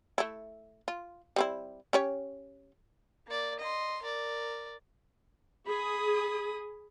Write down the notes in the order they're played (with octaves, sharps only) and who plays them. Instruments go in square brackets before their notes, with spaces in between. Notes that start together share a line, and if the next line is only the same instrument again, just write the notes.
[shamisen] A3 E4
F4
G3 C4 E4
C#4 G4 C#5
[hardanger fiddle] A#3 D5
D#5 C6
A#4 D5
[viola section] G#4 [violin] B5 D#6